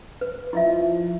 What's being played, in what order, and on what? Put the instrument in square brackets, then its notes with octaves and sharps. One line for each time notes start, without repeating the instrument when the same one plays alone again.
[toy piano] B4
[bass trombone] F3 [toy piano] E4 D#5 E5